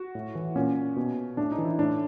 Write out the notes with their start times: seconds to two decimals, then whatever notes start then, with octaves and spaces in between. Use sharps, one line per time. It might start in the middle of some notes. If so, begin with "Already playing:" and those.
Already playing: F#4
0.15 A2
0.35 E3
0.55 A#2 C#4
0.96 B2
1.37 A2 D4
1.52 D#4
1.58 E3
1.65 E4
1.79 A2 D4